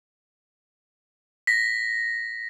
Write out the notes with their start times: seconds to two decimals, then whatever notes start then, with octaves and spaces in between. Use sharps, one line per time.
1.47 A#6 B6